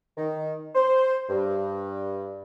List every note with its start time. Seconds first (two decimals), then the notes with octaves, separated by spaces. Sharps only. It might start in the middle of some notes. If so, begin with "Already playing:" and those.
0.17 D#3
0.75 C5
1.29 G2